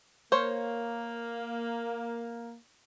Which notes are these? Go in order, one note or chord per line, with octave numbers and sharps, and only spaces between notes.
A#3 C5 C#5